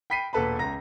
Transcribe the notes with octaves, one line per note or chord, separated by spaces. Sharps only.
G5 B5 B6 C7 D#7
E1 A#2 A4 B4 A5 B5
C#2 A#5 A#6